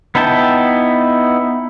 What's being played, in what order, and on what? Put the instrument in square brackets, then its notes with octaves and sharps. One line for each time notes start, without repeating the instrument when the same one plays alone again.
[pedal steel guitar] B3 D#4 E4 G5 A5